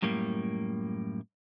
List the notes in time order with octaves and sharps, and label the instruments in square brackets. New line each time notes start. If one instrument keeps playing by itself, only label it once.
[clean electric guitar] F#2 A2 G3 A#3